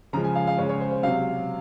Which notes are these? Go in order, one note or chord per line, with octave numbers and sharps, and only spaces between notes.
C#3 F3 G#3 A#5
G#5
F5
F5
C#3 G#3 C#5
C#5
C5
C5
C3 F#3 F5